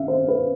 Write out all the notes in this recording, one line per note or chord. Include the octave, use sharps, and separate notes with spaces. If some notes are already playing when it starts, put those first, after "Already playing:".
Already playing: E5 F5
C5
B4